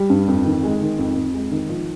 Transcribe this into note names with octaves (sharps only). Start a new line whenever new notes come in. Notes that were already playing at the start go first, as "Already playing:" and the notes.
Already playing: G3
G2
F2
D#3
G#3
D#3
F2
F2
G#3
D#3
F3